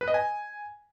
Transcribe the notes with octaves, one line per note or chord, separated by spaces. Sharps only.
B4
D#5
G#5